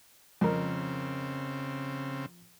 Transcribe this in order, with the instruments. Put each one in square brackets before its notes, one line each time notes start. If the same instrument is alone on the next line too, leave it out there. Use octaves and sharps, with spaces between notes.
[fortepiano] F2 A#4 [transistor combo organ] C#3 C4